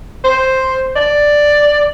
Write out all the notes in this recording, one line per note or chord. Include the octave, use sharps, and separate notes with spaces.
C5
D5